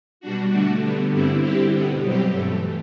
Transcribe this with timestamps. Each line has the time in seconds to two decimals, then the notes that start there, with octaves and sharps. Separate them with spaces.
0.20 B2 G3 D4 F#4
0.50 D3 A3 D4 F#4
0.80 D3 G3 B3
1.10 G2 D3 G3 C4 E4
1.40 D3 G3 C4 E4 G4
1.71 B2 G3 B3
2.01 B2 F#3 C4 G4
2.30 G2 E3 A3